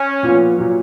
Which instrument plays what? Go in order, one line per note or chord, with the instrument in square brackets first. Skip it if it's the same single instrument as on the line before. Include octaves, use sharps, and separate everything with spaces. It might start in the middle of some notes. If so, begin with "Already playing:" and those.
Already playing: [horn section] C#4
[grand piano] A#2 F3 B3 F4
A#2 F#3